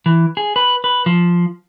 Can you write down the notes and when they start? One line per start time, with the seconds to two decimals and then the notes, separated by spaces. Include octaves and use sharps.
0.06 E3
0.37 G#4
0.56 B4
0.84 B4
1.06 F3